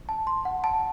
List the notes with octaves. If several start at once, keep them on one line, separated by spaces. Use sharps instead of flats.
A5
C6
F#5
A5